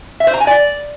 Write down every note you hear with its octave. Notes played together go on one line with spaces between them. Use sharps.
E5
C5
A#5
G#5
D5